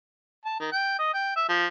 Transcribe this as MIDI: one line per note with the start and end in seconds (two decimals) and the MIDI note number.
0.45 0.56 81
0.60 0.69 51
0.72 0.96 79
0.99 1.09 75
1.14 1.35 79
1.36 1.44 76
1.49 1.67 53